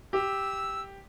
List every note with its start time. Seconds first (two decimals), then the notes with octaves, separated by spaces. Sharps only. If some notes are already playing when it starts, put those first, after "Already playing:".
0.13 G4 E6